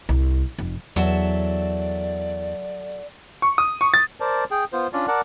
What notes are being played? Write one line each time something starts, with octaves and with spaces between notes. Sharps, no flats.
C2
F1
E2 F#3 A4 D5 E5
C#6
D#6
C#6
A6
A#4 C5 D5 A5
G#4 G5
B3 F4 C5
C#4 D4 F4 D5
A#4 D5 F#5 A5